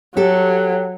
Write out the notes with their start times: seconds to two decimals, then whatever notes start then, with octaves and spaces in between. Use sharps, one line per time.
0.17 F#3 G4 A4